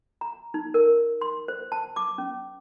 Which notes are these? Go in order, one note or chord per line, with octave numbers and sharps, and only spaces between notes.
A#5
D#4
A#4
C6
C5
A5
D6
C#4